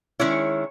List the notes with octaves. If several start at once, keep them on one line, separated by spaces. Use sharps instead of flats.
D#3 G#3 C#4 E4 C#5